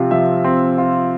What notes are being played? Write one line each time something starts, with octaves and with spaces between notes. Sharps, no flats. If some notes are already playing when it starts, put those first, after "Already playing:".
Already playing: C3 F3 C4 F4
F3 E5
C4
F4